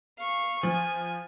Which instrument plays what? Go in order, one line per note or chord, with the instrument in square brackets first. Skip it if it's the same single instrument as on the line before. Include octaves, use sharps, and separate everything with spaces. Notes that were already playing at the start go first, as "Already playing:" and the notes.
[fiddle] F5 C#6
[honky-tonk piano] F3 [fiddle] G#5